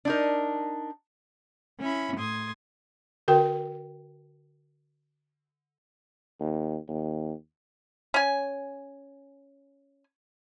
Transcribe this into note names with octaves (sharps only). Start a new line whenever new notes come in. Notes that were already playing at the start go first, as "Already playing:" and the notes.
D4 D#4 A#4
C#4 E4 E5 B5
A2 C6 D#6 G#6
D3 F#4 A#4 G5
D#2
D#2
C#4 G#5